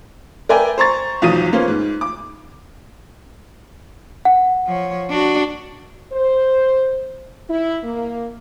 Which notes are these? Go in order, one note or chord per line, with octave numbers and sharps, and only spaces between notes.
A#4 B4 D5 E5 G5 G#5
C5 A#5 C#6 A6
B1 E2 F3 F#3 D#6 D#7
A#3 B3 C#4 F4 C5
G#2
D6
F#5
F3 C#5
D4 F#4
C5
E4
A#3